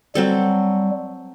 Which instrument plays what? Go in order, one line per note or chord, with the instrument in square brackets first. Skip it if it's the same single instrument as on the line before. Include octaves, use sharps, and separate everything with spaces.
[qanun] F#3 C4 A4 [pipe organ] G3